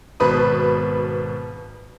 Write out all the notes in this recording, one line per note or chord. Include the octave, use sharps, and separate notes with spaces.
G#1 B2 B4 B5 D#6